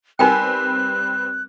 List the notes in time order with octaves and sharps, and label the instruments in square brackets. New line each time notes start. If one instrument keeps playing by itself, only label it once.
[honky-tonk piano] G3 C4 B4 [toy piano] D#4 A#4 G5 [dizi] F#6